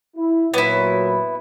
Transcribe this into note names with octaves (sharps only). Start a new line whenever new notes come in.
E4
A#2 F#3 B3 E4 C#5